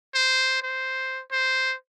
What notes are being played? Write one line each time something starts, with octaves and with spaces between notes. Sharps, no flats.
C5
C5
C5